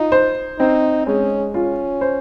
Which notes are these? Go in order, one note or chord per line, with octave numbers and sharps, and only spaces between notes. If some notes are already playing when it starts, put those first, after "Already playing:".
Already playing: D#4 F4
C5
C4 D#4
G#3 C#4
C#4 F4
C5